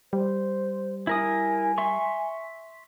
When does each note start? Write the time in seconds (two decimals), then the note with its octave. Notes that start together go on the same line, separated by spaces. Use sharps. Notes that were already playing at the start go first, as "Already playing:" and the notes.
0.13 G3 C5
1.07 E4 A#4 G#5 D#6
1.78 E5 C6 C#6